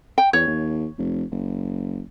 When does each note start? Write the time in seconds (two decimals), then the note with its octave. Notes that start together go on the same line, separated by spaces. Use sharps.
0.18 G5
0.33 E2 C#5
0.47 D#2
0.98 F1
1.32 F#1